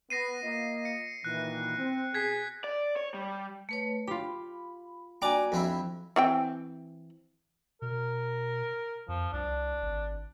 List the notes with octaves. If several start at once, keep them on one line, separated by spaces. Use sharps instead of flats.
B3 A#6 C7 D#7
A#3 F4 D#5
C#7
A#2 D#3 E3 F#6
C4
B2 G#4 G#6 B6 C7
D5
C#5
G3
A3 B4 C#5
F4 G4 B5
A#3 D4 F#4 D5 G5 G#5 A#5
F2 C4 E4
E3 C4 G5
B2 A#4
F2 F3
C2 D4
G#1